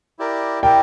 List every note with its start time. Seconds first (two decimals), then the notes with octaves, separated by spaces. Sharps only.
0.19 E4 G4 A#4 D5
0.63 E4 G4 A#4 D5 G5